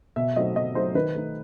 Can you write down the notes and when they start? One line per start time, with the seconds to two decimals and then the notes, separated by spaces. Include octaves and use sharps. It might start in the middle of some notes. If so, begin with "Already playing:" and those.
0.16 B2 E5
0.36 F#3 A3 C4 D#4 D#5
0.56 B2 D#5
0.75 F#3 A3 C4 D#4 C5
0.95 D#3 B4
1.15 A3 D#4